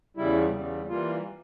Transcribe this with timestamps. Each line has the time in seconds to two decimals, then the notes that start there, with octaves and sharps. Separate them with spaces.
0.17 E2 C#3 G3 E4
0.53 E2 C#3 G3
0.89 E3 G3 A#3 F4